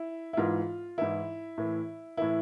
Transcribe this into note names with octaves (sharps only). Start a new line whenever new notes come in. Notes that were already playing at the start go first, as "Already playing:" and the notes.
Already playing: E4
E4
G#2 E3 F4
G#2 E3 E4
A2 E3
A2 E3 E4